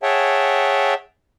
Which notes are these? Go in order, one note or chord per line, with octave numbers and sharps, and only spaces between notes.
G#4 C#5 E5 F#5 G5 A5